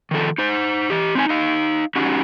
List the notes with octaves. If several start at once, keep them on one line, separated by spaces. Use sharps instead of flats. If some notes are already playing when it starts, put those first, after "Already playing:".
D#3 F3 A4
D#4 C5
E3 G4
C4 D#4 G#5
D#4 F5
C#4 D#4 F#4 G4